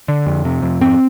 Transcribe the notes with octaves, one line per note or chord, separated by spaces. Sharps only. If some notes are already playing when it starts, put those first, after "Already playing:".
D3
F2
C3
F2
G#2 C4